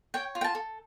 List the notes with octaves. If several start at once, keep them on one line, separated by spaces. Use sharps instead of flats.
C#5 G5
F4
G5
A5
A4